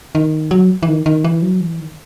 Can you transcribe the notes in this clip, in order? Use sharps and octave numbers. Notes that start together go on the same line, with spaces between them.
D#3
F#3
E3
D#3
D#3
E3
F#3
E3
D#3